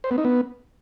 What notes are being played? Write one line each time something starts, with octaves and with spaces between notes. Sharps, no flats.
C5
B3
D#4
B3